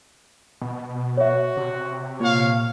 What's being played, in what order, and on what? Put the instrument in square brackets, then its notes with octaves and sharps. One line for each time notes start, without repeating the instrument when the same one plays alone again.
[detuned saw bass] B2
[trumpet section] F#4 [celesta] C#5 D5 E5
[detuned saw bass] C3
[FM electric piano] A#2 [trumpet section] C#5 F5